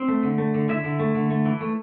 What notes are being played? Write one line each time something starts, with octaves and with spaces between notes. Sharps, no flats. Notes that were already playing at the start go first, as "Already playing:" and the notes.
Already playing: C4
A3
D3
A3
D3
D3 E4 E5
D3
A3
D3
A3
E3
A3